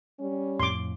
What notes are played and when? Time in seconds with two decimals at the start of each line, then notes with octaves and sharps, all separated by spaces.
0.19 G3 C#4
0.60 F2 A2 C6 D6